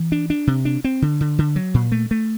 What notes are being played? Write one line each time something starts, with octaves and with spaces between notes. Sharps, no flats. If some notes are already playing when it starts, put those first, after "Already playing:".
Already playing: E3
D4
D4
C3
D4
C4
D3
D3
D3
F#3
A#2
A3
A3